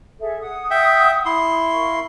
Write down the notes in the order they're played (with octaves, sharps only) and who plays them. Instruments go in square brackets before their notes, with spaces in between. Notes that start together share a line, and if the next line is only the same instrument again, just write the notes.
[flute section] G#4 A4 E5
F#5 D#6
[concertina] E5 G5
E4 C6
[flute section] A#4 F5 C#6